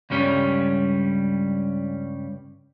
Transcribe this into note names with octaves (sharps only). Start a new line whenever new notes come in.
C#2 G2 G3 C#4